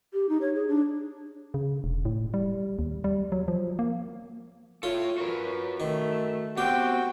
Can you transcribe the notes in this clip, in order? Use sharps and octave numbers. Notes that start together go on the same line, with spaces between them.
G4
D#4
C#5
G#4
D4
C#3
E1
A2
G3
D#2
G3
F#3
F3
A#3
F4 A4 C#5 E5
F#4 A#4 B4
D#3 A3
B3 C4 F#4 G4 G5